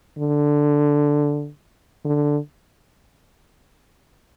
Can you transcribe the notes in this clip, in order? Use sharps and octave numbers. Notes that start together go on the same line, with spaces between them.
D3
D3